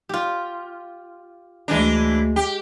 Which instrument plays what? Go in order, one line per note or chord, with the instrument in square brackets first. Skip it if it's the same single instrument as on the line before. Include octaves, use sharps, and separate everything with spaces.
[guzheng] F4 G4
[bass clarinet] D2 [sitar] E3 D4 [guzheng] G#3 G#5 A#5
[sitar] G4